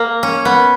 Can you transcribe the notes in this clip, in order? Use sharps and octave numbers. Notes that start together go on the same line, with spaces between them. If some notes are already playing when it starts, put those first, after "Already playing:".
Already playing: A#3
C#4
B3